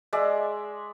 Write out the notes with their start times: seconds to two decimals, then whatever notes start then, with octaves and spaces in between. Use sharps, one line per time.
0.13 G#3 D5 E5